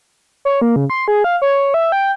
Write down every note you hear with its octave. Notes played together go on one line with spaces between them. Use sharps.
C#5
A#3
C#3
C6
G#4
F5
C#5
E5
G5